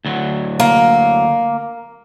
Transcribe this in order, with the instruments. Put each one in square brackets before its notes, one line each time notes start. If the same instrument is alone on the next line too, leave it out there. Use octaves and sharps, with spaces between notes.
[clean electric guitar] D2 F#3
[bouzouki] A#3